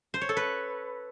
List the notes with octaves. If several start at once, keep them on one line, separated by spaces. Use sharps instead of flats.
C5
C#5
A4
B4